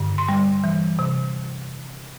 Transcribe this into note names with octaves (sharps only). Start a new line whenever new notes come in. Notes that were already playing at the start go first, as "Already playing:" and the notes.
Already playing: G2 D3
C6
G3
E3
C3